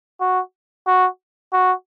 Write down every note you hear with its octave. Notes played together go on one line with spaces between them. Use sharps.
F#4
F#4
F#4